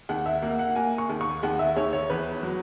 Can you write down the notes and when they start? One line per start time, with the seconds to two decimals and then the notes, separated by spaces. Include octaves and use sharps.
0.09 D#2 F#5
0.26 E5
0.43 A#3 F#5
0.59 F#5
0.76 A#3 G#5
0.98 C#6
1.09 D#2
1.21 C#6
1.43 D#2 F#5
1.59 E5
1.76 D#2 C#5
1.93 C#5
2.10 E2 B4
2.43 F#3